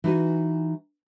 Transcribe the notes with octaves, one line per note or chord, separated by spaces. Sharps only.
E3 D#4 F#4 G#5